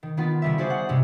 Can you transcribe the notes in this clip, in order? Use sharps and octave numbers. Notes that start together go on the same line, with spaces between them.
D#3
D#3 B3 F4
C#3 G3 E5
F#4 G#4 C5 D5
F#5
G2 C3 G#3